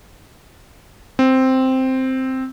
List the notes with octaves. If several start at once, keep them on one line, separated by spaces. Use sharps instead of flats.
C4